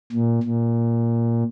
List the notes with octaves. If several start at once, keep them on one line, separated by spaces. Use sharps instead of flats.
A#2
A#2